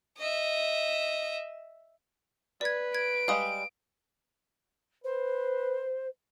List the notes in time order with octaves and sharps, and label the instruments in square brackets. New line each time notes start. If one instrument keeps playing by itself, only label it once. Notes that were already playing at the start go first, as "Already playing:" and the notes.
[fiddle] D#5 E5
[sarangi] B4 [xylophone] D5 G#6
[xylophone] G#6 [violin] D7
[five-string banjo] G3 G#3 G5 [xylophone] F5 D#6
[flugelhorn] B4 [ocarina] C5